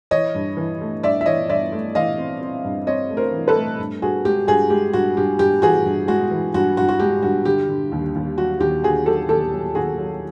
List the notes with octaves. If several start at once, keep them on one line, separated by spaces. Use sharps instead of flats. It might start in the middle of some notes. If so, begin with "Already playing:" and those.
E3 C#5 D#5
G2
E3
A3
G2 D5 E5
E5
E3 C#5 D#5
G2 D5 E5
A3
E3 D#5 F5
C4
C4
G2
C4 C#5 D#5
A3
A#4 C5
E3
A4 B4
A3
G2
G2 F#4 G#4
G#3 G4
G2 F#4 G#4
G#3 G4
G2 F#4
G2 G4
G2 G4
E3 F#4 G#4
G2
G#3 F#4
E3
G2 F#4
G2 F#4
F#4
G#3 G4
G2 F#4
D3 G4
D3
D#2
D#2
F#3 F#4
D#2 G4
D3 F#4 G#4
F#3 G4 A4
D#2 G4 A4
F#3
D#2 F#4 G#4
F#3